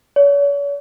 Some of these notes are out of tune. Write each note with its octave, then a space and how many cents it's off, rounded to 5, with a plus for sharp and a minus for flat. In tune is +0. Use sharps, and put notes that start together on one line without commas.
C#5 +40